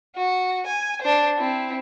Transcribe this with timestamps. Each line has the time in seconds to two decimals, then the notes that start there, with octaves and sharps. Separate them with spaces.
0.16 F#4
0.66 G#5
1.01 D4 C5
1.37 C4 E4